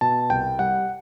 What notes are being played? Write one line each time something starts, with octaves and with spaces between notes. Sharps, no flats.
B2 A5
C2 G5
G3 F#5